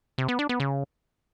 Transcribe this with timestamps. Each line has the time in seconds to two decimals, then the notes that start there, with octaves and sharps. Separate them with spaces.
0.18 C3
0.28 B3
0.39 D4
0.49 B3
0.60 C#3